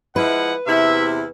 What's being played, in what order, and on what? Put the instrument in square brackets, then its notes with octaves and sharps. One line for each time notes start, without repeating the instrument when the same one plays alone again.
[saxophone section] F3 G#3 E4 [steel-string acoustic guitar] B4 [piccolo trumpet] F#5
[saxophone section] E2 C3 E4 [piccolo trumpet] E5